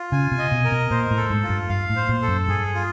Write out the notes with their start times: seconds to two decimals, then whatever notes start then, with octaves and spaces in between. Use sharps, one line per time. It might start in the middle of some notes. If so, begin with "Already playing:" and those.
Already playing: F4
0.12 C#3 G#5
0.31 C3
0.38 D#5
0.52 B2
0.64 A#4
0.72 B2
0.91 A#2 C5
1.11 A2
1.17 A4
1.30 G#2
1.43 F4
1.49 G2
1.69 G2 F5
1.90 A2
1.96 C5
2.09 A#2
2.22 A4
2.28 F#2
2.48 G2 G#4
2.74 F4